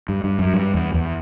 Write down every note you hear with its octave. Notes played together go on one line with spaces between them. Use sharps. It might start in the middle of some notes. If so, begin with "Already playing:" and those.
G2
G2
F#2
G2
E2
E2